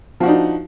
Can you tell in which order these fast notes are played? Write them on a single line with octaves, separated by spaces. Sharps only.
F3 F#4 D4 D#4